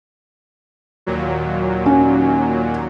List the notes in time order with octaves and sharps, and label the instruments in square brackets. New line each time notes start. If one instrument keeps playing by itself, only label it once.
[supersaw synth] D#2 A#2 F#3
[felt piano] C#4